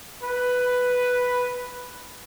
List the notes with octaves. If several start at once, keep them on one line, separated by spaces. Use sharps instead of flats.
B4